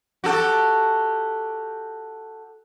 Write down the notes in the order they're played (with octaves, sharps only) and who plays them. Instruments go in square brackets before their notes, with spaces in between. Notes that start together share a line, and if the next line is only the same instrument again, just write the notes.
[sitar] F#4 G4 A4